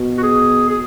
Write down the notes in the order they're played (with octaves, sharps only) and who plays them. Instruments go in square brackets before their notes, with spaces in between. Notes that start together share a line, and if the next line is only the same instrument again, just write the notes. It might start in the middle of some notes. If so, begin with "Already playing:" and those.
Already playing: [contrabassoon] B2
[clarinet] F#4
G#4
G#4